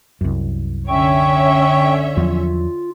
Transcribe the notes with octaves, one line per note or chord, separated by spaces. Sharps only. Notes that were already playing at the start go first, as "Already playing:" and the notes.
C2 F#2
D3 C#4 C#5 E5 G5 C#6
E2 F3 F#3 F4